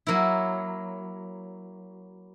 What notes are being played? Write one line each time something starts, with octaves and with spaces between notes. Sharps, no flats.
F#3 A#3 E4